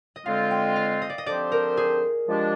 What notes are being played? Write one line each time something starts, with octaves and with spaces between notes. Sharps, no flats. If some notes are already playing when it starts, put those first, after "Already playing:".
D#5
D3 G#3 C4 F4 F5
G5
F5
D#5
D5
D#5
D3 F3 C4 G4 C5 D5
A#4
G#4
F3 G#3 D4 G4